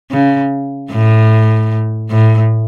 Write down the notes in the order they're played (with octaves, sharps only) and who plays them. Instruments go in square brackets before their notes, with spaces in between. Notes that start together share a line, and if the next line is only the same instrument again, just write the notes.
[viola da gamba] C#3
A2
A2